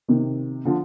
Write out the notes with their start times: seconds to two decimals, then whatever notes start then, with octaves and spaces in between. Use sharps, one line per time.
0.08 C3 D#3
0.65 D3 F3